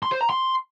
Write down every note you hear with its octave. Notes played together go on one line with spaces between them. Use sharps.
C6
C5
A#5
C6